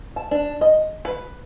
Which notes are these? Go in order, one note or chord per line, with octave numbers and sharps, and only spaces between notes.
A5
D4
D#5
B4